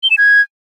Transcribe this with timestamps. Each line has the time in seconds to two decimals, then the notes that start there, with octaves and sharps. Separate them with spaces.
0.03 G7
0.11 E7
0.18 G#6